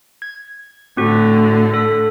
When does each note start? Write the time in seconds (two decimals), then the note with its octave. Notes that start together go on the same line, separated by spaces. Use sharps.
0.22 G#6
0.97 A2 D3 C4 F#4
1.74 A4 B6